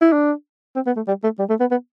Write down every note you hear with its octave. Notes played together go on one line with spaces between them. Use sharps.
E4
D4
C4
B3
A3
G3
A3
G3
A3
B3
B3